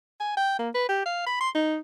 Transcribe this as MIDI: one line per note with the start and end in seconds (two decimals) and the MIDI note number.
0.20 0.36 80
0.37 0.58 79
0.59 0.69 58
0.74 0.87 71
0.89 1.01 67
1.05 1.24 77
1.26 1.40 83
1.40 1.49 84
1.55 1.77 63